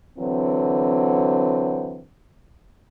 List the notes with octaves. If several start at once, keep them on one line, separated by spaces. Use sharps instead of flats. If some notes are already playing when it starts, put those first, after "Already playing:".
D3 E3 F#3 C4